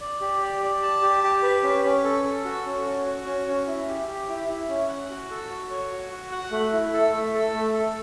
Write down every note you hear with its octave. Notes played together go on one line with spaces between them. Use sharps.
D5
G4
D5
D5
A5
G4
G4
B4
C#4
C#4
A4
A4
F#4
C#4
F#4
F#4
C#4
C#4
E4
G4
G4
E4
E4
C#4
F#5
F#4
A4
F#4
C#5
F#4
F#4
F#5
A3
E4
A4
A3
A4
A3
A4